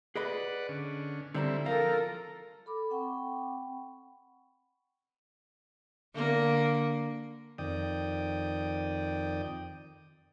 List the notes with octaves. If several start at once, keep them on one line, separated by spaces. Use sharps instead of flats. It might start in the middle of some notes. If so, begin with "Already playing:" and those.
G#4 B4 D5 D#5 F#5 B5
D3 C#4
D3 G3 C4 E4 D5 A#5
F3 A4 A#4 F5 A#5
A4 B5 D6
C4 F#5 G5 B5 C#6
D3 A#3
F2 D#3 D5 G5 D#6